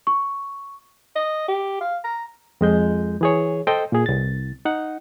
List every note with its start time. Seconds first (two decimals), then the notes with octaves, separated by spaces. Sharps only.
0.07 C#6
1.15 D#5
1.48 G4
1.81 F5
2.04 A#5
2.61 F2 G#3 G6
3.21 E3 G#4 C#5
3.67 A4 C5 D#5 G5
3.92 A#2 G#4
4.06 C2 A6
4.65 D#4 F#5